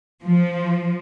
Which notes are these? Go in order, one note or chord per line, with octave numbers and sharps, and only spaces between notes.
F3